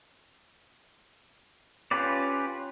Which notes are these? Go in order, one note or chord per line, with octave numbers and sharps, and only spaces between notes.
C#4 F4 G4 B4 D5